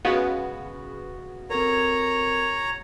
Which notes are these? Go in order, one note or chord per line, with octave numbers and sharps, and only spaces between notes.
C#3 G#3 B3 F#4
C4 A4 A#4 C#5 A#5